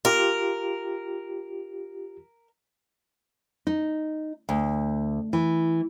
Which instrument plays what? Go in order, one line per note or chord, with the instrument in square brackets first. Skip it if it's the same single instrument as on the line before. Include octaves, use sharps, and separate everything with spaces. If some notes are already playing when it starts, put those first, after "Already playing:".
[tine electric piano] F4 G4 [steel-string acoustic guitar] A#4
[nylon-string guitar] D#4
D2
E3